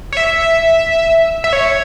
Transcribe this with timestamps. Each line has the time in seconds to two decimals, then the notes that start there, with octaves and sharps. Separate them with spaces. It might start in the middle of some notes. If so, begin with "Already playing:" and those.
0.12 C#5
0.17 E5
1.44 E5
1.53 C#5